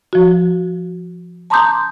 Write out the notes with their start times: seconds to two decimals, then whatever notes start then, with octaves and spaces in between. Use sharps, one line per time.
0.13 F3 F#4
1.50 A5 A#5 C6 D6 D#6 G6